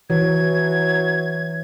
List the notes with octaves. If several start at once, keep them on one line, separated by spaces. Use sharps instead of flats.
E3 F#3 G#6